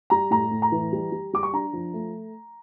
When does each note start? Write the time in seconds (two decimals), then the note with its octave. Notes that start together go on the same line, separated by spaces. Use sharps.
0.10 G3 A#5
0.30 A2 A#5
0.51 A2
0.62 A#5
0.72 E3
0.92 G3
1.12 G3
1.33 G3 D6
1.43 C#6
1.53 D4 A#5
1.73 F3
1.94 A3